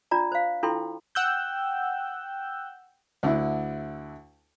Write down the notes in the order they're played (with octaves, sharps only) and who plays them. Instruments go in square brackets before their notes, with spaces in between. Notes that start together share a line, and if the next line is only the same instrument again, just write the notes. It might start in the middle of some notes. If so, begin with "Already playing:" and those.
[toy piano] D4 F4 D5 A#5
C5 F5
D4 E4 F4 A4 G5 C6
[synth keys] F#5 G5 E6 F#6 G6
[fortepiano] D2 D3 E4